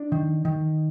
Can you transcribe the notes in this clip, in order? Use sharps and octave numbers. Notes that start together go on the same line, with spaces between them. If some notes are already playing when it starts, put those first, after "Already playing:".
Already playing: D4
D#3
D#3